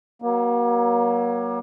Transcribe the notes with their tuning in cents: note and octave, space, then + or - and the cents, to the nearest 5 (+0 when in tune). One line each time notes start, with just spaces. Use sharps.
F#3 +20 A#3 +35